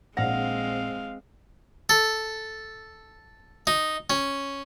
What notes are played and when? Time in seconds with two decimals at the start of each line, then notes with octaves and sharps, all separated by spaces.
0.17 A#1 G#3 C4 F5 F#5 A#6
1.89 A4
3.67 D#4
4.10 C#4